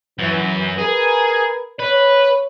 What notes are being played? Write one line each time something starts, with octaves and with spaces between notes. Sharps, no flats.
F#2 E3
G#4 A#4 B4
B4 C#5